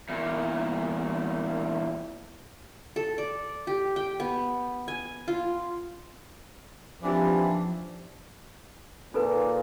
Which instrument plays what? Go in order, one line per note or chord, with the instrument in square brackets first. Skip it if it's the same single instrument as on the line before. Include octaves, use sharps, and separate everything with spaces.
[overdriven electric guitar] E2 A#2
[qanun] A4
D5
G4
G5
B3
G#5
F4
[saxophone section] D#2 D4 [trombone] E3 [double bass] F3 [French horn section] C4 F4 G4
[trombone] A#2 [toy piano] D#4 A4 B4